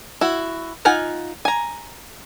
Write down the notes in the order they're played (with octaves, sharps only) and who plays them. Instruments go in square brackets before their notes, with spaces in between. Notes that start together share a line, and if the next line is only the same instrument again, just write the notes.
[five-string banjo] E4 F#4
D#4 F4 F#5 G#5
G#5 A#5